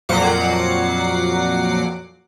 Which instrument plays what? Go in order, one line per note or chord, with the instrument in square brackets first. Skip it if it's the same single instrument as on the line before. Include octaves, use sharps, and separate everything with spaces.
[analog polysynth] F2 A#2 F#3 F#5 D6 C7